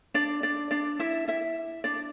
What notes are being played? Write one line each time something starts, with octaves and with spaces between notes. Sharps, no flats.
D4 D5
D4 D5
D4 D5
E4 E5
E4 E5
D4 D5